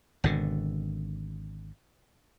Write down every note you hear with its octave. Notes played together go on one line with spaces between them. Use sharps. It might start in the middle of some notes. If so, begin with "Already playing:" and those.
G#1 B2 D3